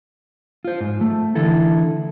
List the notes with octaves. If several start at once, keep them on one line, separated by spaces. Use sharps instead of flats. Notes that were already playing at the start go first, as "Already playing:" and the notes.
F4 C5
G#2
A3
D3 E3 E4 A4